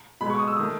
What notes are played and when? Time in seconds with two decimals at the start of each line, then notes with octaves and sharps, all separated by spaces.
0.21 B2 G#3 B5
0.30 C#6
0.39 D#6
0.47 E6
0.57 D#3 A3 D#6